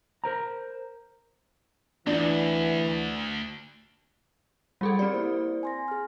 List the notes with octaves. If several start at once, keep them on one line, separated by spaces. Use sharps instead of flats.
A#4 C5 A#5
D2 E3 D4
G3 G#4 A4 B5
C4 G4 A#4 D5
A#3 E4 C5
G#5 C6 A#6
G#4 F6